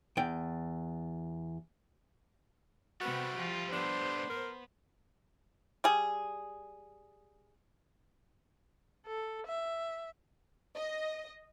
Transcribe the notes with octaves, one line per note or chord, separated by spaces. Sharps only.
E2 G5
C3 G3 A3 B3 F#4
F3 F4 G4
B3 D4 C5
A#4
G3 G#4
A4
E5
D#5